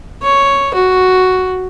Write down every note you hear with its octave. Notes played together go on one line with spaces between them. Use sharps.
C#5
F#4